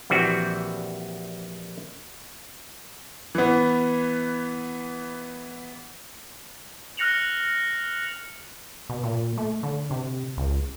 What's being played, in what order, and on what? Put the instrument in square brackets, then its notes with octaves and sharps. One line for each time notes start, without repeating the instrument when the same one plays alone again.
[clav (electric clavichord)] A#1 E3 G3 C4 F#4
[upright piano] E3 B3
[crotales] F6 F#6 A#6 C#7 F7 F#7
[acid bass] B2
A#2
A3
D3
C3
C#2